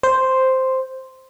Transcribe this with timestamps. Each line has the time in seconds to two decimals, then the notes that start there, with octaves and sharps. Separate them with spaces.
0.03 C5